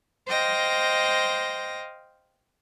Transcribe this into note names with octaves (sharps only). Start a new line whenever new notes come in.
C5 D#5 F5 G5 A#6